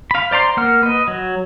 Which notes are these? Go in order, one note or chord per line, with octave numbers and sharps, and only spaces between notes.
F5 B5
C5 D5 A#5 C6
A#3 F#5 F6
B4 D#5
F#3